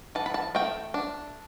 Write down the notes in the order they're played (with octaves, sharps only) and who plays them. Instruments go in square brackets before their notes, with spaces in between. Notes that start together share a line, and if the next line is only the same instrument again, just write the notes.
[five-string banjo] E3 A5
B5
A5
A3 G5
D4